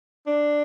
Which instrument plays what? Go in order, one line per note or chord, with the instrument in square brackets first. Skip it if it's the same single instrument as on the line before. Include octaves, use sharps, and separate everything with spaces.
[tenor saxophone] D4